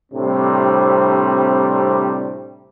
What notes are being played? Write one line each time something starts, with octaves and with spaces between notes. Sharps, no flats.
A2 C3 G3 C4 D4